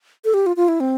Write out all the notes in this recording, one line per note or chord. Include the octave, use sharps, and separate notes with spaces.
A4
G4
F4
F4
E4
C4